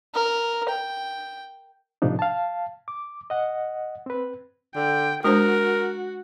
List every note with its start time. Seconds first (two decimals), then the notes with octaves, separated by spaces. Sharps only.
0.14 A#4
0.69 G5
2.02 A2 C3 F3 D4 D#4
2.19 F5 A5
2.88 D6
3.30 D#5 F#5
4.06 C4 B4
4.76 D3 G5
5.24 G#3 D4 F#4 A#4 C5